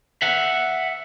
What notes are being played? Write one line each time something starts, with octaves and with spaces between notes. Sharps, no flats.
E5 F#5